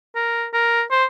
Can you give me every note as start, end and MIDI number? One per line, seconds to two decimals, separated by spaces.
0.15 0.46 70
0.53 0.83 70
0.91 1.05 72